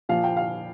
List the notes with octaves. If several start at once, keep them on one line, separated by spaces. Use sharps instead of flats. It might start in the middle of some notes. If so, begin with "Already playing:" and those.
A#2 F3 F5
G5
F5